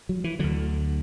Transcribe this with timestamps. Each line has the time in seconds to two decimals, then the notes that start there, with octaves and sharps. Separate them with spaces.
0.09 F#3
0.24 E3
0.39 D2 D3 F#3